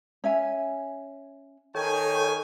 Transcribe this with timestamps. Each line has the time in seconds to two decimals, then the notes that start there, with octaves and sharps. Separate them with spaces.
0.24 C#4 E5 G#5
1.75 D#3 A4 C#5 G5 G#5